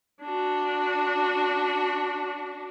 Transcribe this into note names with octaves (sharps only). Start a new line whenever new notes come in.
D4 F#4